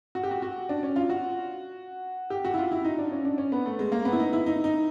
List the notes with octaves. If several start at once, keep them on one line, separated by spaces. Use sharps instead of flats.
F#4
G4
F#4
F#4
D4
C#4
F4
F#4
G4
F#4
E4
F4
E4
D#4
D4
C#4
D4
C#4
B3
A3
G#3
A#3
B3
E4
D#4
E4
D#4
D#4